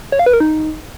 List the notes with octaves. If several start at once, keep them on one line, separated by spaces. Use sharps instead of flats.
C#5
F5
B4
A#4
D#4